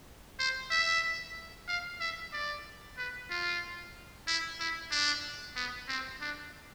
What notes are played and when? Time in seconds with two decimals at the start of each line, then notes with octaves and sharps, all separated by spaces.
0.39 C5
0.71 E5
1.68 F5
2.00 E5
2.33 D5
2.97 B4
3.30 F4
4.28 E4
4.60 E4
4.92 D4
5.56 B3
5.88 C4
6.21 D4